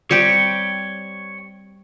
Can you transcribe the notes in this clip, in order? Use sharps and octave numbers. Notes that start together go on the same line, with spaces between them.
G3 C4 G4 C#5 G5